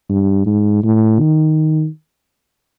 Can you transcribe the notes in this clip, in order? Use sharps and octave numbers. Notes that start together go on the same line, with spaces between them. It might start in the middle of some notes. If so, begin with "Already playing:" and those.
G2
G#2
A2
D#3